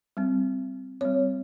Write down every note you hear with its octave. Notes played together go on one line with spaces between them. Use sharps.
G3 C4
G3 C4 C#5